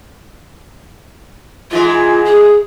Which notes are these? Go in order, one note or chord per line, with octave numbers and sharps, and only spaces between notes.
G#2 E3 G#3 F4
G#4